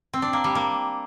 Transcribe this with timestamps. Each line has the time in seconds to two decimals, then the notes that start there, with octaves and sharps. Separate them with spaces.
0.13 C4
0.22 D4
0.33 A#3
0.44 G3
0.55 A#3